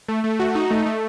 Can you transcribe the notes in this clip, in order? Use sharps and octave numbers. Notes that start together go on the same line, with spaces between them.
A3
A3
F#4
D#4
A3
A3